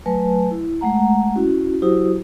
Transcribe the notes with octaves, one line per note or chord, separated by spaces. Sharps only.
F#3 A3 B4 G#5 A5
E4
G#3 A3 F#5 A#5
C#4 E4 F#4
F#3 E4 F#4 G4 C5 D#6